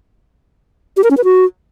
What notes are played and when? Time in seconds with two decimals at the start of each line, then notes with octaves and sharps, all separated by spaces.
0.97 G4
1.04 A#4
1.11 C#4
1.17 B4
1.24 F#4